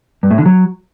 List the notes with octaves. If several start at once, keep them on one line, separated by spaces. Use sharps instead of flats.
G2
A2
D3
F#3